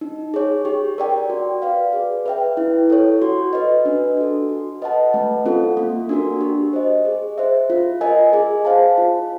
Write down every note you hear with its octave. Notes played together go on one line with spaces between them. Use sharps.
D#4
G#4 C#5
G4
A#4 D5 G5
F#4
B4 D5 F5
G#4
B4 E5 G5
E4
A4 C#5
F#4
B4 D#5
D4
F#4 A4
F#4
B4 D#5 F#5 A5
A3
C4 F4 A4
A#3
D4 F#4 A#4
G4
C5 D#5
G#4
C5 E5
F4
A#4 D#5 G#5
G#4
C5 F5 A5
F4